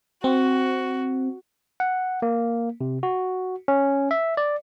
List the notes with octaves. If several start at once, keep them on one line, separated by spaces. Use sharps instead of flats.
C4 F#4
F#5
A#3
C3
F#4
C#4
E5
D5